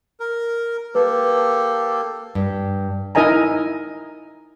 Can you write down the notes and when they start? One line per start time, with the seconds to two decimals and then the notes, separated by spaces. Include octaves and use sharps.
0.20 A#4
0.95 A#3 G4 A4 B4
2.35 G2
3.15 D#4 E4 A#4 D#5 G#5 A#5